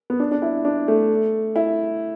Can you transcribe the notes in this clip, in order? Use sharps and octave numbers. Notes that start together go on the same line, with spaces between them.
B3
D4
D4
E4
D4
A3
E4